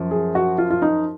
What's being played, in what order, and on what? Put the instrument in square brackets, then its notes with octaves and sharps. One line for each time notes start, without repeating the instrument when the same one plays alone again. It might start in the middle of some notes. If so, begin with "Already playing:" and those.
Already playing: [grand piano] F#2 F3
[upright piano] G#4
F#4
F4
F4
D#4